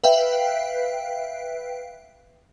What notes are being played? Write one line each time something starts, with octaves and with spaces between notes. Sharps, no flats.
B4 E5 F5 G5